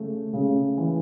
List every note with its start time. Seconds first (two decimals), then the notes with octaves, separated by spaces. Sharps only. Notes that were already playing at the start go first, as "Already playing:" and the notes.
Already playing: C#3 A3
0.33 C#3
0.78 E3